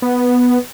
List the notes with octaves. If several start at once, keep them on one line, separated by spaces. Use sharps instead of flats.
B3